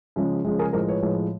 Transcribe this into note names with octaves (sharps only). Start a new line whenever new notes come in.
C#3 F3 G#3
C#3 F3 G#3
G#4 A#4
A2 F3 G#3 A#4 C5
B4 C#5
A2 F3 G#3